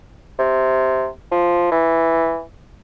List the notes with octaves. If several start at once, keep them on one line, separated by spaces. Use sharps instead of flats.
C3
F3
E3